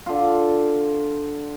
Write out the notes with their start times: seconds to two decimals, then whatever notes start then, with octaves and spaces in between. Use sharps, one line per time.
0.06 D3 F4